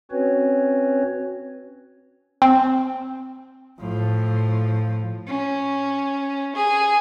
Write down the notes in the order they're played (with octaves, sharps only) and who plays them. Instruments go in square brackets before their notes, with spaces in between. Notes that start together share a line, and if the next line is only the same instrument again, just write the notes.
[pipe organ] C4 C#4 F#4 B4 C#5
[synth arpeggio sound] C4
[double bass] A2 F3
[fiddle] C#4
G#4